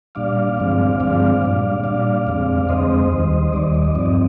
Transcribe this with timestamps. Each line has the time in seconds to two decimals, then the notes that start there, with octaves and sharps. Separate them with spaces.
0.15 A#2 G3 D4 D5 F5
0.57 G2 D3 F3 G#3 C4
1.00 G2 D3 F3 G#3 C4 D5 F5
1.42 A#2 G3 D4
1.84 A#2 G3 D4 D5 F5
2.27 F2 D3 G#3 C4
2.69 F2 D3 G#3 C4 C5 D#5
3.12 D#2 D#3 G3
3.53 D#2 D#3 G3 D5
3.64 D#5
3.74 D5
3.85 D#5
3.95 G2 F3 C4 D5
4.06 D#5